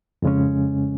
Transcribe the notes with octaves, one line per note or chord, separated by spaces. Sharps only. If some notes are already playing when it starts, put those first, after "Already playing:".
F2 C#3 G#3 C#4